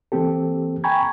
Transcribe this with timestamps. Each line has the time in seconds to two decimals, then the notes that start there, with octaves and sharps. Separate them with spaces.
0.12 E3 A#3 C4 G4 A4
0.84 G5 G#5 A#5 B5 C#6 G#6